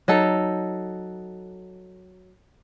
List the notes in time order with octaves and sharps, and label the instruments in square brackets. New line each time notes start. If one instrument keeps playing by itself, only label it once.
[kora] F#3 D#4 A4